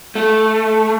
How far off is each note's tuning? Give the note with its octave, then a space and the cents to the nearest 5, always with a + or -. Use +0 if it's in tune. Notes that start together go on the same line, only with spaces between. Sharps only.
A3 -10